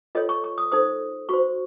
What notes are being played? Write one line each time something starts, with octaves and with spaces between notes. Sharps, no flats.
F4 A4 C#5 D#5
C#6
C#6
D#6
D#4 A4 C5 D#6
F#4 C5 C#6